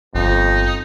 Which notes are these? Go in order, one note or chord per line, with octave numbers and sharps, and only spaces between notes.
G1 F2 D#4